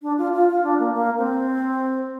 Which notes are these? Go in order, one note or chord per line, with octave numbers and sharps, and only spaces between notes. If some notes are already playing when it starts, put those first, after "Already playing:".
D4
F4
F4
F4
D4
A#3
A#3
C4